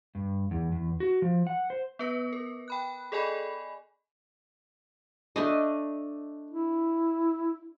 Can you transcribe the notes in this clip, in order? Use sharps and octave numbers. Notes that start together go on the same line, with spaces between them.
G2
E2
E2
F#4
F3
F#5
C5
B3 B4 A#6
A#4
G5 B5 F#6
G#4 A4 D5 D#5 G#5 B5
A3 D4 D#5
E4